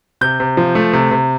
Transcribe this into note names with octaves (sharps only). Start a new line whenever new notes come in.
C3 G6
C3
F3
A3
C3
C3